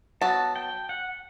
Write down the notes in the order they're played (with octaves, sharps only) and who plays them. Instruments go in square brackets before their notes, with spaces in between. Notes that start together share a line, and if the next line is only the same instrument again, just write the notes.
[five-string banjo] F#3 B3 F#4 [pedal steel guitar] A5
[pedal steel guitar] G5
F#5